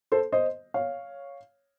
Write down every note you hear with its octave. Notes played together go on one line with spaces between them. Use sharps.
A4 C5
C5 D#5
C#5 F5